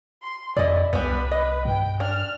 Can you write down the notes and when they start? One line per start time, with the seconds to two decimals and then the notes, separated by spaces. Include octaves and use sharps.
0.22 C6
0.57 F2 E4 D5 D#5
0.93 C2 G3 B3 B4
1.31 D#5
1.65 G2 G5
2.00 D4 F6